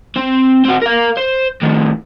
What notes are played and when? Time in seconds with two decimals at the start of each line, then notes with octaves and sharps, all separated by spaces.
0.16 C4
0.64 C4 F#4
0.82 A#4 F5
1.17 C5
1.62 A2 D#3